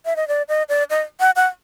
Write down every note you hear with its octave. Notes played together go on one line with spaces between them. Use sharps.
E5
D#5
D5
D#5
D5
D#5
F#5
F#5